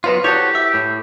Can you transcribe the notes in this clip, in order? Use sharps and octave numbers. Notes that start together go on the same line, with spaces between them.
F#3 B3 F4 B4 C5 C6
E4 F#4 G4 A4 C#5
E5
A2